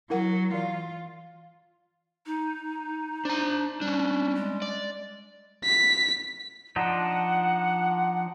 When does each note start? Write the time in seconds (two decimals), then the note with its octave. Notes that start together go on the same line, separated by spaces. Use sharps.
0.10 F#3 E4 A#4 F#5
0.54 E3 F4
2.26 D#4
3.25 D4 C5 A#5
3.81 G3 C#4 D4
4.36 G#3
4.62 D5
5.65 B6
6.76 F3 D4 D#4 F#5